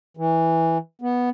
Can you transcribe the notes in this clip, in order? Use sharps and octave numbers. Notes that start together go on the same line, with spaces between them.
E3
B3